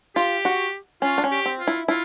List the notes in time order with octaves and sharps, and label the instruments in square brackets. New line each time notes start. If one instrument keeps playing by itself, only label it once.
[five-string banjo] F4 [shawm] G4
[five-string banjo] F#4
[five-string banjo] C#4 [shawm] F4
[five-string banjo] D4
C#4
[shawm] G4
[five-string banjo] C4
[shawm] F4
[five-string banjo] E4
[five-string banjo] E4 [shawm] F4